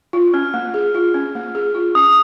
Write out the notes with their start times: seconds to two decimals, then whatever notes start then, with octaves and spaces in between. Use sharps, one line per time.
0.13 F4
0.34 C#4 F6
0.54 A#3
0.74 G#4
0.94 F4
1.14 C#4
1.35 A#3
1.55 G#4
1.75 F4
1.95 C#4 D#6